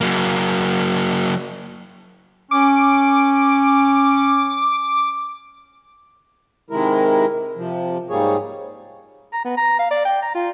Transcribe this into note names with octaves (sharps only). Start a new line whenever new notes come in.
F#3 A#3
C#4 D6
C3 D#3 G#3 E4 A#4
C3 F3
G#2 G3 A#3 G#4 C#5
A#5
B3
A#5
F5
D5
G5
A#5
F4